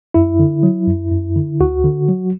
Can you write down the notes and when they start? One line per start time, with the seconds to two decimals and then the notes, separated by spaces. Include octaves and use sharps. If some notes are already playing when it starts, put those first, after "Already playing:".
0.14 F#2 E4
0.39 D3
0.63 F#3
0.88 F#2
1.11 F#2
1.36 D3
1.60 D2 F#4
1.84 D3
2.09 F#3